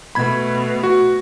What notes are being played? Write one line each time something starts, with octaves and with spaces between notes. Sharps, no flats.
B2 A3 B5 G#6
F#4